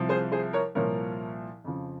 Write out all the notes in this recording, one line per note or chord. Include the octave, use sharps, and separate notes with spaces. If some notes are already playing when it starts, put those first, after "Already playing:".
Already playing: C2 C3 F3
G#4 C5
G#4 C5
A#4 C#5
C2 A#2 F3 A#4 C#5
F2 C#3 F3